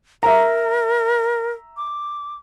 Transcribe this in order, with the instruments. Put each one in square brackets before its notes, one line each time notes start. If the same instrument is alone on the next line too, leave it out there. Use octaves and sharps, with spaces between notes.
[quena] A#4 [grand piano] E5 A#5
[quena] D6